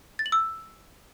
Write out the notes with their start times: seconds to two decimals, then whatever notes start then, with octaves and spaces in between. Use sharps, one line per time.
0.19 A6
0.26 F#7
0.32 E6